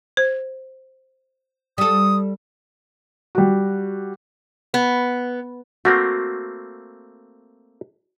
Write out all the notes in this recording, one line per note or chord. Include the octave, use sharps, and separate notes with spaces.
C5
G3 A4 D#6
G3 F#4
B3
A3 A#3 C4 F#4